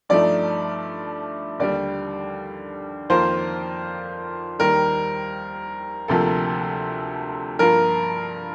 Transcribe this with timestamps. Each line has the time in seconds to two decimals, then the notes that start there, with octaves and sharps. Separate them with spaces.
0.09 G2 F3 A3 D#4 D5
1.59 D#2 D3 G3 D5
3.10 F2 D#3 A#3 F4 A#4 C5
4.59 D#2 D#3 G3 A#4
6.08 D2 C3 F3 A#3 A4
7.59 G2 F3 A#3 F4 A#4